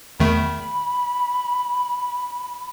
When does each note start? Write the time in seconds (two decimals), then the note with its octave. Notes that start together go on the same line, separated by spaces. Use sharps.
0.20 E2 D#3 A3 B5